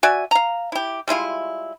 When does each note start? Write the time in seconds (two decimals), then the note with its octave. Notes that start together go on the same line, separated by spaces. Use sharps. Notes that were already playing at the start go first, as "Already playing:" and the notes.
0.03 F#4 D5 E5 G#5
0.31 F5 A#5
0.72 E4 G4
1.08 G3 G#3 E4 F4